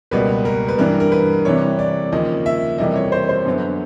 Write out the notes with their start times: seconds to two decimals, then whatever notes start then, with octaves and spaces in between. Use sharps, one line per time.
0.11 C#2 B2 G3 A#3 B4
0.45 A#4
0.68 B4
0.78 G2 E3 G3 A#4
1.00 A#4
1.12 B4
1.45 C3 E3 G3 C#5
1.79 D5
2.12 D#2 C#3 F3 A#3 C#4 D#5
2.46 E5
2.78 F2 C3 E3 G3 A#3 D#5
2.96 C#5
3.12 C5
3.29 C5
3.45 F#2 D3 F#3 B3